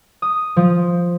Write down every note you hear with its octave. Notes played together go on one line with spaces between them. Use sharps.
D#6
F3